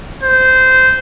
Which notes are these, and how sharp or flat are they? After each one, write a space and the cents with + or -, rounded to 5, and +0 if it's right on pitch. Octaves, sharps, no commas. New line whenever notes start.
C5 -15